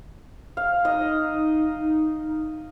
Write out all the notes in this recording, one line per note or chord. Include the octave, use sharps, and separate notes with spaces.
F5
D#4 D#5